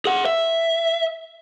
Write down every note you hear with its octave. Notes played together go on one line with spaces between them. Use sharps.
G#4 F#5
E5